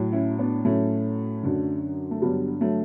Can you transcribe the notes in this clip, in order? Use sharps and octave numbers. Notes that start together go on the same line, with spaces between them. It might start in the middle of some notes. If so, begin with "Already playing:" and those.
Already playing: A2 F#3
C#4 E4
B3 D4
A2 F#3 A3 C#4
F#2 D3 F#3
A3
G2 D3 F#3 G3 B3
F#3 A3